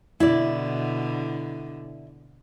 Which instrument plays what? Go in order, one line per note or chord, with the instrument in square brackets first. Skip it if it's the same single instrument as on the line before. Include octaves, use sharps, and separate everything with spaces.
[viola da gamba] B2 D3 [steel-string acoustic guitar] E4 D5